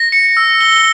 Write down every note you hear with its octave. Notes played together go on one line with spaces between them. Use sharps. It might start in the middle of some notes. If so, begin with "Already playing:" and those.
Already playing: A#6
C#7
E6
G7